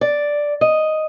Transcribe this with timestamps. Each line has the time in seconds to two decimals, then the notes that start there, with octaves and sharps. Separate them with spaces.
0.01 D5
0.61 D#5